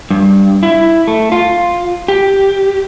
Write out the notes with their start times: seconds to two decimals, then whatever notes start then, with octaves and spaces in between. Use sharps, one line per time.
0.11 G2
0.63 E4
1.08 A3
1.32 F4
2.08 G4